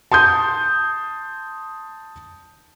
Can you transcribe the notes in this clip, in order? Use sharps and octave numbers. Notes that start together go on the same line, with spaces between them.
A5 C6 D#6 G6